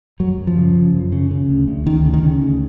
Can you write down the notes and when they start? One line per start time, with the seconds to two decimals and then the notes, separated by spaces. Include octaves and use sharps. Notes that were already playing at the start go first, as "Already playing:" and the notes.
0.20 F#2 F#3
0.38 F#2
0.47 F3
0.57 C#3
0.75 C#3
0.94 F#2
1.12 C#3
1.31 C#3
1.49 D2
1.68 D2
1.86 D2 D#3
2.05 C#3
2.14 D#3
2.23 C#3
2.42 D2